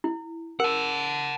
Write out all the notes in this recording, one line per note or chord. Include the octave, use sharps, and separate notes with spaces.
E4
A#4 F#5 A5